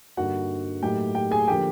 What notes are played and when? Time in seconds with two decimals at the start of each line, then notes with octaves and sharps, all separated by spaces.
0.17 G2 D3 G3 A#3 D#4 F#4 F#5
0.83 A2 F#3 A#3 D#4 G4 G5
1.15 G4 G5
1.31 G#4 G#5
1.48 D3 F3 A#3 G4 G5